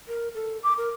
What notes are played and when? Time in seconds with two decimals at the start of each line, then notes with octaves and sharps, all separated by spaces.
0.08 A#4
0.35 A4
0.63 D6
0.78 A#4